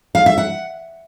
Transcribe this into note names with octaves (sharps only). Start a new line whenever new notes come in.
F5
E5
F#5